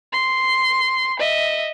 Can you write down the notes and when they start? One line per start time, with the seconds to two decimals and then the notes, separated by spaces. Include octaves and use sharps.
0.12 C6
1.19 D#5 E5